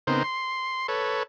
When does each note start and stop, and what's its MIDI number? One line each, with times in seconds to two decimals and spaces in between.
0.07 0.23 49
0.07 0.23 59
0.07 0.23 60
0.07 0.23 63
0.07 0.23 70
0.07 0.23 72
0.24 0.87 84
0.88 1.23 69
0.88 1.23 71
0.88 1.23 73